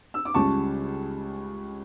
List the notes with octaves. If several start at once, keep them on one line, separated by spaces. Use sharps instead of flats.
E6
D6
C#2 C#3 G3 A5 C#6